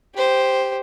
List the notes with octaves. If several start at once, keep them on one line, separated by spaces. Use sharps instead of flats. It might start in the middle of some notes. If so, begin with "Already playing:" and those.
G4 C5